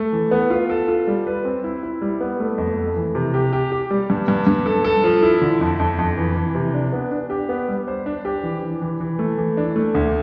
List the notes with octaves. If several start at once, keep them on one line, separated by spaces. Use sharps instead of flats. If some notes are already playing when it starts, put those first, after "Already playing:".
Already playing: A3
E3
B3
F4
A4
F4
G3
B4
C4
E4
E4
G3
B3
A3
F2
A3
E3
C3
G4
G4
G4
G3
G2
G2
G2
A4
A4
F3
E4
D3
F2
F2
F2
E3
E3
C3
D4
B3
D4
G4
B3
G3
C5
D4
G4
E3
E3
E3
E3
A3
E3
D4
A3
D2